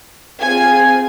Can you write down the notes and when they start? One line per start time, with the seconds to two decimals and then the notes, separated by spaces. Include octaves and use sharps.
0.41 C4 F4 G#4 G#5